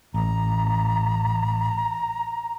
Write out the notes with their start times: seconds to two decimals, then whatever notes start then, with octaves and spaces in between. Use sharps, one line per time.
0.14 A1 A#5